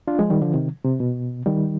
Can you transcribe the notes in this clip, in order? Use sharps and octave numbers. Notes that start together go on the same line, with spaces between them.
D4 F4
F3 G#3
D#3 G3
D3 F3
C3 D#3
C3
B2
D#3 G3